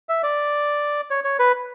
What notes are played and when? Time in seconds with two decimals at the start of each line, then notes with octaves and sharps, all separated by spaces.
0.09 E5
0.23 D5
1.11 C#5
1.24 C#5
1.39 B4